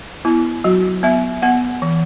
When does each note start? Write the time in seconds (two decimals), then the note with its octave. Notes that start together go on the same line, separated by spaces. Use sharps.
0.25 B3 E4
0.64 F#3 F#4
1.03 B3 E5
1.42 B3 F#5
1.82 E3